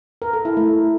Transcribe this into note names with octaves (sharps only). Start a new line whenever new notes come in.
A#4
A4
E4
A3